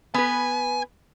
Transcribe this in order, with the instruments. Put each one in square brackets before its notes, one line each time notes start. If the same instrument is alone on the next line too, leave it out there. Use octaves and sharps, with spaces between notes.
[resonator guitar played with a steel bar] B3 B4 [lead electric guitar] G#5